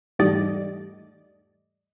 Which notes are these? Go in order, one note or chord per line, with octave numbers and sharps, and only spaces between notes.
E2 G#2 G3 A3 D5 D#5